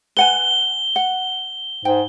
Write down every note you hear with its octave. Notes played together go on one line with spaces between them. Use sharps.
B4 F#5 G#5 G7
F#5
G#2 G5